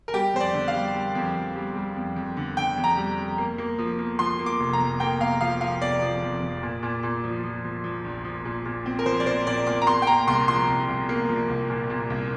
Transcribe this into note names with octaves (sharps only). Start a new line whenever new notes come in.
A#4
G3 G4
F2 C5
D5
D3
F5
G3
G3
F2
F2
G3
G3
F2
F2
D3
D3 G5
F2
A#5
G3
F2
A#3
A#3
F3
A#3
F3 C6
A#3
D6
F1
A#5
F2
A#3 G5
A#3 F5
F3 F5
F3 F5
F1 D5
F3
F2
F2
A#2
A#2
A#2
F3
F3
F3
F3
A#1
F3
A#2
A#2
C4
A#4
F3 C5
D5
A#2 C5
A#2 D5
A#2 D6
A#5
A#3 C6
G5
A#3 A#5
C2 C6
F3 C6
C2
C2
A#3
F3
C2
A#2
A#2
C2